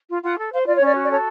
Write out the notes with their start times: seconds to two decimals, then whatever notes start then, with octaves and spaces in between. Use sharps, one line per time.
0.09 F4
0.23 F4 F#5
0.38 A4
0.52 C5 F5
0.66 F4 D5
0.76 C#5
0.81 C#4 D5
0.96 F#4
1.03 D5
1.09 A4 C#5